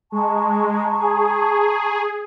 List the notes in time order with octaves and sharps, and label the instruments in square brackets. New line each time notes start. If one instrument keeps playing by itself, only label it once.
[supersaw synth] G#3 [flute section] A5 A#5 C#6
[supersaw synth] G#4